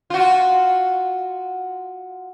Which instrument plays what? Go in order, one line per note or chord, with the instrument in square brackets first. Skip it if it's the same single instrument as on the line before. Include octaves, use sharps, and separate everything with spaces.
[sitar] F4 F#4